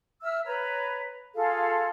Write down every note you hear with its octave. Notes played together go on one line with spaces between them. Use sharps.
E5 E6 F6
B4 C#5 A#5
F4 G#4 A4 F5